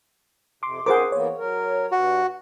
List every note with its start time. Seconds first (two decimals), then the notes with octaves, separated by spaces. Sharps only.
0.63 F2 C3 C6 D6
0.86 G#2 C#4 F4 G#4 A#4 C5 F#5 D6
1.12 E3 A#3 B3 C#5
1.38 F#3 A#4
1.92 G2 F#4